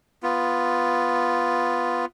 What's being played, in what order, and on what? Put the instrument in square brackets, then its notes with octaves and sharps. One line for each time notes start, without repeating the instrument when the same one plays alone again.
[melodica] B3 F4